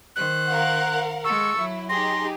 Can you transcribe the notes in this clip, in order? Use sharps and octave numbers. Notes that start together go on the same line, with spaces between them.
D#3 C5 F#6
A#4 F5 F#5
G#3 A4 C#6 E6
F#3 E4
D#4 G4 G#4 C6 A#6